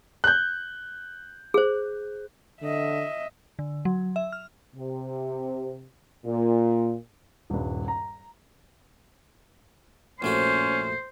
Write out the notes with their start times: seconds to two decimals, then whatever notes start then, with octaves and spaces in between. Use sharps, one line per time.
0.24 F#6 G6
1.54 G#4 C5
2.62 D3 D#5 E5
3.59 D3
3.85 F#3
4.16 E5
4.32 F6
4.76 C3
6.25 A#2
7.50 D#1 G2
7.88 A#5
10.22 A#1 A3 C#4 F#4 C5